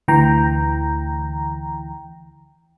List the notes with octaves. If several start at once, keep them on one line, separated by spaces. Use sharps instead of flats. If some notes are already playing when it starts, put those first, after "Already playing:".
D2 E3 G5 A#5